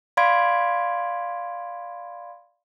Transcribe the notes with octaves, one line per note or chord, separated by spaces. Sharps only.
D5 F5 B5 C6 G#6 D7